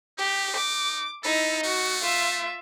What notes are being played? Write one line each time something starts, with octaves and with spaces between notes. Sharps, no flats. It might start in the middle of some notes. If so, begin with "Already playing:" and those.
D#4 G4
D6
D#4 E4 A4
A3 F#4
F4 E5